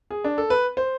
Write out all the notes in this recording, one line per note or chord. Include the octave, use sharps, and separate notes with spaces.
G#4
D4
A4
B4
C5